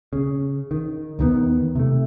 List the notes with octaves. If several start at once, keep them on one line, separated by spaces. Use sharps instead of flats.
C#3
D#3
D#2 D#3 B3
C3 A3